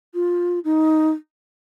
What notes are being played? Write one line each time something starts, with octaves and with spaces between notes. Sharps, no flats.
F4
D#4